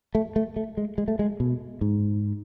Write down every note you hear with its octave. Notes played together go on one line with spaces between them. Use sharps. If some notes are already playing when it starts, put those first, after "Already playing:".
A3
A3
A3
G#3
G#3
A3
G#3
B2
G#2